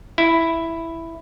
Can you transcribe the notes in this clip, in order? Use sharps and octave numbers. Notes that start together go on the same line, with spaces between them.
E4